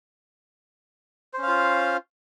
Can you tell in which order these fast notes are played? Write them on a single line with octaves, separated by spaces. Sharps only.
C5 C#4 F5 F4